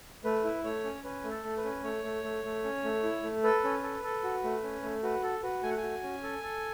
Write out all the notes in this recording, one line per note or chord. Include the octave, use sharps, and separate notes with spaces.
A3 B4
E4
A3 C#5
C#4
C#4 B4
A3
A4
A3
B4
C#4
A3 C#5
A3
A3
A3
C#4
A3
E4
A3
A4 B4
C#4
A4
A4
F#4
A3
C#4
A3
F#4 B4
A4
F#4 B4
A3 G#5
F#5
G#5
F#4
C#4
A4
A4